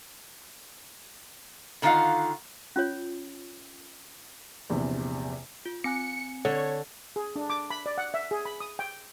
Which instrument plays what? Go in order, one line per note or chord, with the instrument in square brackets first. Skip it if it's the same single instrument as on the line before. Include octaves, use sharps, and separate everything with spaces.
[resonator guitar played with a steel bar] D3 D#3 D4 F4 F5 F#5
[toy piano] C#4 F4 C#5
[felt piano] A#1 E2 C3
[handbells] F4
[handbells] C4 G#5 F#6 [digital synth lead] C#7
[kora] D3 [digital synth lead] C#5
[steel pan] G#4
D4
D6
B5
D5
F#5
E5
G#4
B5
D#6
G5